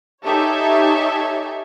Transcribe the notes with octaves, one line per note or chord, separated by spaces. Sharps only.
D#4 G4 A4 C#5 E5 G#5